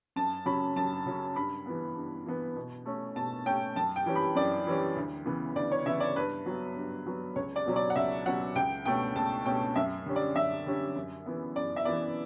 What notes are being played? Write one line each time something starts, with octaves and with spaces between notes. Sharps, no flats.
F#2 A5
C#3 F#3 C#4 B5
F#2 A5
C#3 F#3 C#4
G2 B5
E3 B3
G2
E3 B3
B2
A3 C#4
B2 A5
A3 C#4 G5
F#2 A5
G5
E3 G3 C#4
B5
F#2 D5
E3 G3 C#4
D2
C#3 E3 B3
D2 D5
C#5
C#3 E3 B3 E5
D5
G2 B4
F#3 B3
G2
F#3 B3
C#2 C#5
D5
B2 F#3 C#4
D5
F#5
C#2 E5
B2 F#3 C#4 F#5
C#2 G5
B2 A3 C#4 G5
C#2 A5
B2 A3 C#4 G5
F#2 E5
D3 G3 C#4
D5
F#2 E5
D3 G3 C#4
F#2
E3 B3
F#2 D5
E5
E3 B3 D5